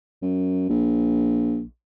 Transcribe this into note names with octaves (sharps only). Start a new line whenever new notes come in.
F#2
A#1